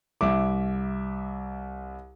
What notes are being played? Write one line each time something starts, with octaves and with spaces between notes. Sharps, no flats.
C2 E5 D6